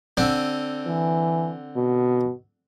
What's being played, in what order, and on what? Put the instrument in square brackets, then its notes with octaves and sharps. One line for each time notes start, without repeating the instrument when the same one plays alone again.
[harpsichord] D3 C4
[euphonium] E3
B2